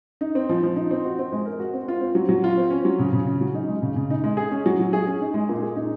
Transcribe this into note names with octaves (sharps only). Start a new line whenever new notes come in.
D#4
C4
F3
F3
D#4
C4
F#4
C4
G#3
A#4
F#4
C4
F4
C4
F#3
F#3
F4
C4
C#4
F#3
C#3
C#3
C#4
F#3
D#4
G#3
C#3
C#3
D#4
G#3
G#4
C#4
F#3
F#3
G#4
C#4
D#4
G#3
A#2
G#4
D#4